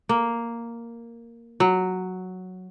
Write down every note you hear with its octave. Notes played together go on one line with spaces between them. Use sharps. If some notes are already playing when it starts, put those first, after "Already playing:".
A#3
F#3